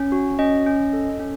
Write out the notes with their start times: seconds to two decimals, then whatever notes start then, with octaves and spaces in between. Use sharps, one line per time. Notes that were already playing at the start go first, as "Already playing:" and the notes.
Already playing: C#4
0.12 F#4
0.39 C#4 D#5
0.66 C#4
0.93 A4
1.20 C#4